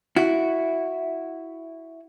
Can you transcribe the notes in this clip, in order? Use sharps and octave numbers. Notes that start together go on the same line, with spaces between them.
E4 F#4